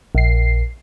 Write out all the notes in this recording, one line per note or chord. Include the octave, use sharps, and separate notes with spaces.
A#1 C7